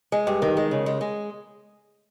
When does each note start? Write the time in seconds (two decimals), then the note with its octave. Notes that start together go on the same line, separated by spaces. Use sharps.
0.12 G#3
0.27 G2
0.42 D#3
0.57 G#3
0.71 C#3
0.86 G#3
1.01 G#3